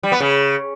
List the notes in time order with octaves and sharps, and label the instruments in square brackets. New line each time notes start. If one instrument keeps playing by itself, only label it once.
[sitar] G3
B3
C#3